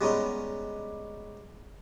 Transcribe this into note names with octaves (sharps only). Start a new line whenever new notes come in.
G3 G#3 B3 C#4 D#4